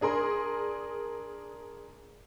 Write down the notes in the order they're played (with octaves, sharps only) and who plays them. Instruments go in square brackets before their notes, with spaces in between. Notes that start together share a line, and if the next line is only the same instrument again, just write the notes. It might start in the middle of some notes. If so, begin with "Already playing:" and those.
[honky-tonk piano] D4 G#4 A#4 C6